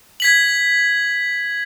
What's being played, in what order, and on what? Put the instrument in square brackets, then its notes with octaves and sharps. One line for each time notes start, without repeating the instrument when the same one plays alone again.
[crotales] G#6 B6 F#7